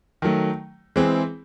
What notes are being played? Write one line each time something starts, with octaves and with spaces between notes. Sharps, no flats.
D#3 F#3 A3
E3 G#3 C4 E4 G#4